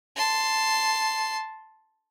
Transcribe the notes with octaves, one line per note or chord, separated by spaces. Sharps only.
A5 C6